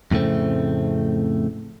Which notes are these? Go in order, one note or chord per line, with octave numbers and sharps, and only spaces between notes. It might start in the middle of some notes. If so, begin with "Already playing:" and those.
F2 A2 C#3 A3 C4